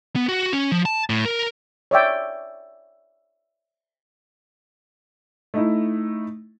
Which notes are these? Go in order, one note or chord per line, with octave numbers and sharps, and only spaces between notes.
B3
F#4
C#4
F3
A5
A2
A#4
C#5 D5 E5 G5
A3 D#4 E4